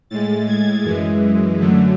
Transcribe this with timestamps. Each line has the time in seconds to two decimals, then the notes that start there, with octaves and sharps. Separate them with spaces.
0.10 A2 G#3 A6
0.48 G#6
0.84 F#2 E3 G#3
1.58 F#2 D3 F#3 A3